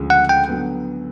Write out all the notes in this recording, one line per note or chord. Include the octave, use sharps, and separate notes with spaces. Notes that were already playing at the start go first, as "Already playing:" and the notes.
Already playing: D2 C#3 F3 G#3
F#5
G5
D3 F#3 B3